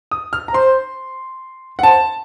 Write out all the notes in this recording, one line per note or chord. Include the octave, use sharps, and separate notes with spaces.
D#6
F6
A#5
C5 C6
F#5
C5 A5